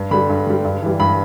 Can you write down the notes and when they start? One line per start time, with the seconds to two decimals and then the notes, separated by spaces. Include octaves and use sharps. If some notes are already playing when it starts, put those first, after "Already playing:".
Already playing: G2
0.11 D3 G3 B5
0.29 G2
0.47 D3 G3
0.64 G2
0.82 E3 G3
1.00 G2 B5